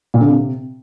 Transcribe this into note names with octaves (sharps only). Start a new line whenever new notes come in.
A#2
D3
C3